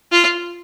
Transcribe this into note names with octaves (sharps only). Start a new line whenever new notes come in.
F4